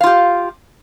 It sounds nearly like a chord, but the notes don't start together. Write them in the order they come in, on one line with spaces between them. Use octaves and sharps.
F5 F4 G4